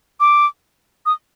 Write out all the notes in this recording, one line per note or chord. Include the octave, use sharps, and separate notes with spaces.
D6
D#6